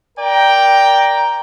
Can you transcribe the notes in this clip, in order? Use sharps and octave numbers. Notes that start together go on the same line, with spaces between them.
A#4 D5 G5 A#5